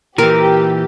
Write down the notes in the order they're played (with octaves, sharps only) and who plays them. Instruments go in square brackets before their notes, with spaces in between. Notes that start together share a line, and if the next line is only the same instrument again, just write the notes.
[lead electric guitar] A#2 E3 [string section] G4 [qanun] A#4